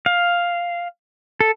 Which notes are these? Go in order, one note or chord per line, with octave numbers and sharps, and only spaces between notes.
F5
A4